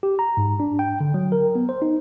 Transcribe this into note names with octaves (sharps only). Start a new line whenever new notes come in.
G4
A#5
G#2
D4
G5
D3
F#3
A#4
B3
C5
D#4